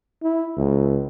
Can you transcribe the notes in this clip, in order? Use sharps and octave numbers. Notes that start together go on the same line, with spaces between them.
E4
C#2